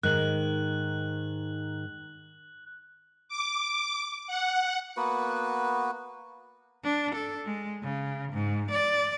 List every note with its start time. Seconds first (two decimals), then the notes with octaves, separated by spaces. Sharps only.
0.03 G#2 D#3 F#6 F#7
3.29 D6
4.27 F#5
4.97 A#3 B3 F#4 B4
6.84 D4
7.15 A4
7.45 G#3
7.83 C#3
8.33 G#2
8.71 D5